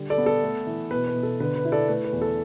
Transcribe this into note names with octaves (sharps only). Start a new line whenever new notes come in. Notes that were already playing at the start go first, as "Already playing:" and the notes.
Already playing: D3 G3
A4 D5
B3
A4
A3
E3
B2 B4
B4
B2
A4
D3 B4
B4
E4
A4 D5
A3 B4
B4
E2
A4